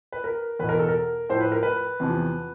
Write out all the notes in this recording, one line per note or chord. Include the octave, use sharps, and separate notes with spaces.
B4
A#4
E2 B2 B4
A#4
A4
A#4
A2 F3 C5
B4
A#4
B4
E2 C3 F3